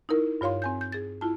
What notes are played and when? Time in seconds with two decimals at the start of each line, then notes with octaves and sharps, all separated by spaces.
0.09 D#4 E4 A#4
0.41 G2 F4 C#5 F5 C6
0.62 C4 G#5 G6
0.81 G6
0.92 G#4 A6
1.21 E4 F4 A5